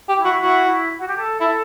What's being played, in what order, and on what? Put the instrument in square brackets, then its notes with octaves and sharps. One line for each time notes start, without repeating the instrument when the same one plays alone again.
[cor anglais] G4
[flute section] E4
[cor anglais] F#4
[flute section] E4 [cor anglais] F#4
[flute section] E4
F#4
G4
A4
[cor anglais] E4 [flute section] A4